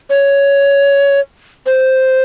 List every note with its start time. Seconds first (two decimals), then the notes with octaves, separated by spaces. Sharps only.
0.10 C#5
1.66 C5